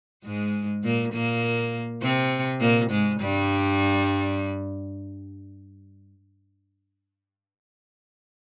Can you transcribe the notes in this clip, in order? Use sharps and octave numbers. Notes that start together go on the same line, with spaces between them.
G#2 G#3
A#2 A#3
A#2 A#3
C3 C4
A#2 A#3
G#2 G#3
G2 G3